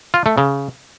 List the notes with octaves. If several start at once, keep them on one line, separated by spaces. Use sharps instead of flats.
F4
A3
C#3